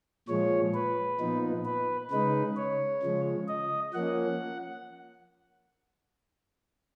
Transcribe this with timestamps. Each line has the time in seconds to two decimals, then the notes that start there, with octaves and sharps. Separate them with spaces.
0.28 A#2 F3 G#3 C#5
0.74 B4
1.20 A#2 F3 B3 D#4
1.65 B4
2.11 C#3 G#3 D#4 B4
2.57 C#5
3.03 C#3 F3 G#3
3.48 D#5
3.94 F3 A#3 C#4 F#5